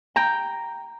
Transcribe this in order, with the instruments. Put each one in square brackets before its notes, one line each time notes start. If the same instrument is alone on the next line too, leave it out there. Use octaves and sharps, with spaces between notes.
[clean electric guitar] G5 [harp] A#5